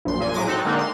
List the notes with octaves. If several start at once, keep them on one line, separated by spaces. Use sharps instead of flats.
A#1 F#2 C6
A#2 G#5
A2 F#3 G#3 D6 A#6 D#7
C4 D#4 F#4 A4
D3 G#3 A#3 C4 D4 D#4
C6